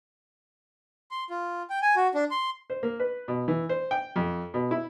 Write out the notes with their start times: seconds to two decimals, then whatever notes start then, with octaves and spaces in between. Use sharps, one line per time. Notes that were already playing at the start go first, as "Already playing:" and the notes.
1.11 C6
1.30 F4
1.70 G5
1.82 G#5
1.96 F#4
2.15 D4
2.31 C6
2.70 C5
2.83 A#3
3.00 B4
3.28 B2
3.48 E3
3.69 C5
3.91 G5
4.16 F2
4.54 B2
4.71 E4